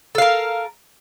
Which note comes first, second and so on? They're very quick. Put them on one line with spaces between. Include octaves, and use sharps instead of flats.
A4 F5 A#4